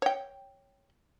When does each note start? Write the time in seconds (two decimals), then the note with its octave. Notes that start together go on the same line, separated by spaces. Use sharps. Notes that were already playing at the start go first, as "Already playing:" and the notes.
0.02 C#5 G5